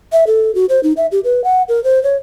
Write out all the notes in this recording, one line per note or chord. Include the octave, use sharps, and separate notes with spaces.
E5
A4
F#4
C5
D#4
E5
G4
B4
F#5
A#4
C5
C#5